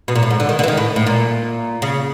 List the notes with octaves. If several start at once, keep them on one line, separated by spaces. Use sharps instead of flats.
B2
A#2
A2
G#2
D3
D#3
D3
E3
D#3
A2
A2
A#2
C#3